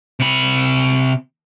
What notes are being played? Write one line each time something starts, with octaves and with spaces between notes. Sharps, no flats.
C3 B5